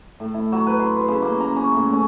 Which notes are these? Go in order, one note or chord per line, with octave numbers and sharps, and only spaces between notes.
A2
E4
F#3
B4
C6
B4
C#3
A#3
A#5
C#4
A2
C#4